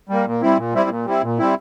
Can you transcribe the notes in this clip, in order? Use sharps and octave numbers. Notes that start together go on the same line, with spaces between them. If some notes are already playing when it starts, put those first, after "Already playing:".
G3 A#3
A#2
G3 C4 E4
A#2
G3 C4 E4
A#2
G3 C4 E4
A#2
G3 C4 E4